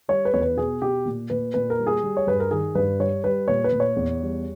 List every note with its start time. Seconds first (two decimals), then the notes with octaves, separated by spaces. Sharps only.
0.08 G3 C#5
0.25 B4
0.33 E2 C#5
0.41 B4
0.57 B2 G#4
0.82 B2 G4
1.06 A#2
1.30 A#2 B4
1.54 A#2 B4
1.70 A#4
1.79 G3
1.87 G#4
2.03 G3
2.17 C#5
2.27 G2 B4
2.40 A#4
2.51 D#3 G#4
2.75 G2 B4
2.99 G3 C#5
3.24 G3 B4
3.48 A#2 C#5
3.64 B4
3.72 A#2
3.80 C#5
3.96 E2
4.21 G3